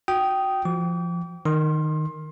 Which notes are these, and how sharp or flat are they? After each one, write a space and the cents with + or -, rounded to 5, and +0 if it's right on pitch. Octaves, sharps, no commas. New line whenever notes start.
F#4 -15 G5 -15 D#6 +0
F3 -20 D6 -40
D#3 -10 C6 +25